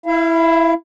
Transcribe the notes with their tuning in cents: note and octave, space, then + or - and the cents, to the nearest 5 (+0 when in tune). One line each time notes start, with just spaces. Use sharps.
E4 +0 F5 -40